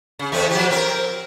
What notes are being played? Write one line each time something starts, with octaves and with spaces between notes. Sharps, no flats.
C#3
E2 A3 C4
F3 G4
C4 A#4